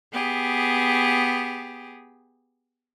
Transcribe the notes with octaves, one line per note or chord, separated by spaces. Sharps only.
B3 G4 G#4